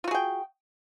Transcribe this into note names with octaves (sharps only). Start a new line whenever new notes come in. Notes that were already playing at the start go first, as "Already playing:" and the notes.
F4 F#4 G#4 G5